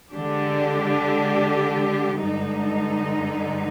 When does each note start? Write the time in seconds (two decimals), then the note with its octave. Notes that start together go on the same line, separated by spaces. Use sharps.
0.13 D3 G#3 D4 G4
2.21 G2 D3 G#3 D#4